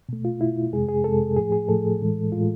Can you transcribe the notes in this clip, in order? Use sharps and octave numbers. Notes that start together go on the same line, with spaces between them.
B2 A3
F4
B2 A3 E4
F2 C3 G#3 G#4
G#4
F2 C3 G#3 A4
A2 F3 A3 G#4
G#4
A2 F3 A3 A4
A2 E3 G#3
A2 E3 G#3 F4